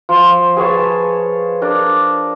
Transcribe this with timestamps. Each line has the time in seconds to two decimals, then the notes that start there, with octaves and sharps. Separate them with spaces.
0.09 F3
0.57 G#4 B4 C#5 A5
1.62 D4 A#4